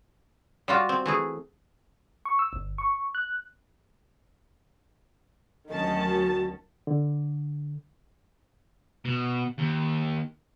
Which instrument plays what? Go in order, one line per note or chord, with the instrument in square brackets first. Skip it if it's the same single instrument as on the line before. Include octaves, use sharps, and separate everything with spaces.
[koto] G3 F4 F#4
C4
E3 A3 G#4
[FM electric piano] C#6
E6
G1
C#6
F#6
[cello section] D2 F#3 C#4 [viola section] D#3 A5 [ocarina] D#5
[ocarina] F#4
[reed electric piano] D3
[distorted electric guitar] B2
D#2